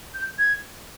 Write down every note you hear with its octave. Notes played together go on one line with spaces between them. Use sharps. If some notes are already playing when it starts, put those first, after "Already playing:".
G6
G#6